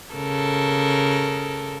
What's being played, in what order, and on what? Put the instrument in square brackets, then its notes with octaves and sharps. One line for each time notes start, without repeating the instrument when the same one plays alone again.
[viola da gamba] C#3 A4 A#4